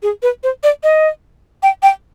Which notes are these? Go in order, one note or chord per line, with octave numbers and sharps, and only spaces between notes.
G#4
B4
C5
D5
D#5
G5
G5